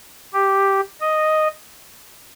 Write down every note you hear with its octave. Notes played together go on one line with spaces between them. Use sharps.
G4
D#5